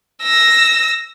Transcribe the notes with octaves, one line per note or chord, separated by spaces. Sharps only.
E6 A#6